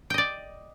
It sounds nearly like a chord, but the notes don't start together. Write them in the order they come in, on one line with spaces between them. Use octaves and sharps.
G5 D#5 D5